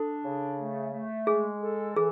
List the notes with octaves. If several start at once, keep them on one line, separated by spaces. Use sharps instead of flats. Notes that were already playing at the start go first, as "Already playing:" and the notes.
Already playing: D4 A4
C#3
A3
A3
G#3 G#4
A4
E3 G#4